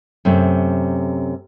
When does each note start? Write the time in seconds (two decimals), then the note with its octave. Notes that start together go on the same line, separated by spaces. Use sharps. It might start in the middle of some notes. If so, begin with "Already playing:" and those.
0.25 F#2 C3 A3